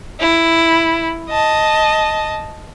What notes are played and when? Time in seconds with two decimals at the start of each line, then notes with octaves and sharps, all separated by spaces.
0.20 E4
1.30 D#5 A5